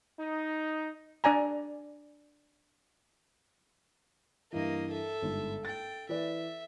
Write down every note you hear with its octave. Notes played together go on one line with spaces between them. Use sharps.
D#4
D4 D5 G#5 A#5
G2 E3 A#3 D#5
A4 E5
G1 G#2
G5 A6
E3 B4 D5 E5